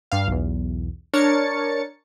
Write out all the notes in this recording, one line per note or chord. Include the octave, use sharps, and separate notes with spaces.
G2 F5
B1 E2
D4 A#4 C#5 A6 C#7